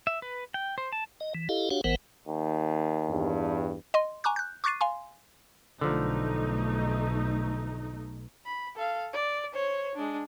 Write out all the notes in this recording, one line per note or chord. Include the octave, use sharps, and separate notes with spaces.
E5
B4
G5
C5
A5
D#5
E3
E4 G4 A4 D#5 F5
D4 F#4 G4 C#5 F5 F#5
G#1 E3 B3 A#4 C5 F#5
D#2
E2 G2
D#5 C6
G#5 A#5 C#6 D6 F#6
F#6 G6
C#6 D6 F#6 A6 C7 D#7
F5 G#5 C6
B1 D3 F3 A3 D#4
B5
A4 F5
D5
C5 C#5
G#3 D4